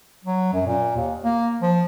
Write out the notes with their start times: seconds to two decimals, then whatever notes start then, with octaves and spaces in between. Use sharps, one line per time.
0.25 F#3
0.53 F#2
0.67 A#2
0.96 D#2
1.23 A#3
1.62 F3